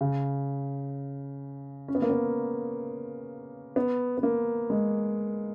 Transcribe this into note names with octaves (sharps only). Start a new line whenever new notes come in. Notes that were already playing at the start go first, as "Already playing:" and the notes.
C#3
C#4
B3
A#3
B3
B3
B3
A#3
G#3